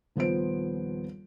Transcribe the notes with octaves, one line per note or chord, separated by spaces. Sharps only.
D#1 F3 B3 C5 D7